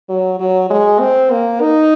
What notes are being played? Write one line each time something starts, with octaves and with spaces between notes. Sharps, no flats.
F#3
F#3
G#3
C4
A#3
D#4